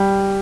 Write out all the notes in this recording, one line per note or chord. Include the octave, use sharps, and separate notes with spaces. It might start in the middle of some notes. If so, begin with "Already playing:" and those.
Already playing: G3